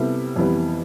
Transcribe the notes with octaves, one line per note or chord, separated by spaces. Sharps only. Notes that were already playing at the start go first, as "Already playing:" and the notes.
Already playing: C3 G3 B3 E4 A4
F2 E3 G3 B3